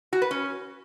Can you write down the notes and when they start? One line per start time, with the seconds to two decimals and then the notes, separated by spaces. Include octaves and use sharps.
0.13 F#4
0.22 B4
0.31 C#4